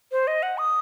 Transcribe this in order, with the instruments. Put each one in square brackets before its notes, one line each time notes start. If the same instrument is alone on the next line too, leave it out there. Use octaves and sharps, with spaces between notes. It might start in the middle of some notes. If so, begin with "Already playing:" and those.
[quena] C5
D#5
F#5
D#6